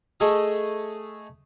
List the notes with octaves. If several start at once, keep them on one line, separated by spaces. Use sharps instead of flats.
A3 G#4 A4 D#5